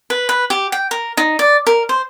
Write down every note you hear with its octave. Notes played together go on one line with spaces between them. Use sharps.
B4
B4
G4
G5
A#4
D#4
D5
A#4
C5